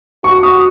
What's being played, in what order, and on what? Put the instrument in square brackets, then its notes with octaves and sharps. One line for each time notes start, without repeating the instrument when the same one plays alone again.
[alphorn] F#4 [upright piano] C#6
[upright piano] D#6